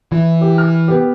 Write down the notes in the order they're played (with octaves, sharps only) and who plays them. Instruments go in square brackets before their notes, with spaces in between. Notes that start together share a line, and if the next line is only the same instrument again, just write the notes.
[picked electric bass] E3 [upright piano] E4
[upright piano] G4
F6
B3 G4